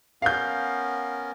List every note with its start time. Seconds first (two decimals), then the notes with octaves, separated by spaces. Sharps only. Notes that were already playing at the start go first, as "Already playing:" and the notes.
0.22 B3 C#4 A#4 F5 G6